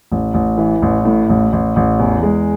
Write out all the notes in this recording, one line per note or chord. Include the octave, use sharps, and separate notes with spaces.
A1
A1
E3
A1
A2
A1
A1
A1
E2
G#3